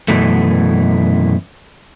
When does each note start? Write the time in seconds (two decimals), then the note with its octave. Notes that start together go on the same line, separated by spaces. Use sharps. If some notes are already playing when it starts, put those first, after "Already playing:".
0.08 F#2 B2 E3 A3